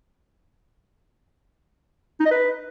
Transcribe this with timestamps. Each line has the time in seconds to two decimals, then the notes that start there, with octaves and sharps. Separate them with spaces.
2.20 D#4
2.26 D#5
2.31 B4